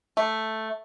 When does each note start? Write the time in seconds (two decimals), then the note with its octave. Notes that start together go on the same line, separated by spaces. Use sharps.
0.17 A3